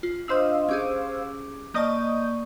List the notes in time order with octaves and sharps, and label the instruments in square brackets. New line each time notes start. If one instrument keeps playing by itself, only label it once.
[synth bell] F4
[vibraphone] D4 D#5 D#6 [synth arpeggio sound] C5 F5 E6
[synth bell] C#4 G4 G#4 [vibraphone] D6
[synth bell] A#3 D5 A5 [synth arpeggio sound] D#5 D#6 G6 [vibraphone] C#6